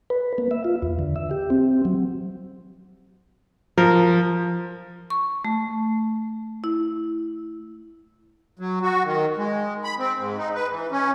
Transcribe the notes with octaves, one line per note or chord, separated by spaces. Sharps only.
B4
A#3
E5
F4
E2
D3
E5
G4
C4
F#3
F3 A#4
C#6
A3
E4
F#3
F#4
D#3
G#3
B5
C4
G#2
D#4
B4
E3
C#4